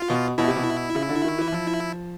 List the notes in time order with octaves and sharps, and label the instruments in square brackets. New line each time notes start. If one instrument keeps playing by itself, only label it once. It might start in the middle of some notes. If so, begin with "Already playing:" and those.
Already playing: [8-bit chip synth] F4
[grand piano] B2
[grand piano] B2 [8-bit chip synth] E4
[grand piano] C3
B2
C#3
D3
D#3
E3
F3